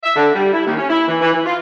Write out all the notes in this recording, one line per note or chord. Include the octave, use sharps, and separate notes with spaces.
E5
D3
G3
E4
D#2
C#4
E4
E3
E3
E3
F4